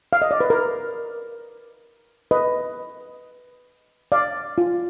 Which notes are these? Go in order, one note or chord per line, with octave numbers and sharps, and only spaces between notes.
F5
D#5
D5
B4
A#4
B4 D#5
D5 F5
F4